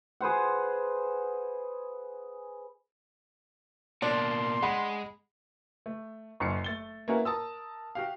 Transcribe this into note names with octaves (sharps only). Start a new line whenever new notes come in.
G#4 B4 C5 F#5
B2 A#3 D4 C6
G#3 F#5 B5
A3
F#1 F#2 C#7
A3 A6 G7
A#3 B3 C#4 E4 F#4 A#4
A#4 A5 D#6 E6
F#4 G4 F5